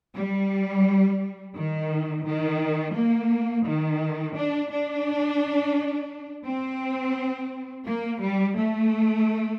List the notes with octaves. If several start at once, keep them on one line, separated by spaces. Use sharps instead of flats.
G3
D#3
D#3
A#3
D#3
D4
D4
C4
A#3
G3
A3